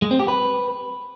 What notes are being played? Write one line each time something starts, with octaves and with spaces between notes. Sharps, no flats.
G#3
C4
G4
B4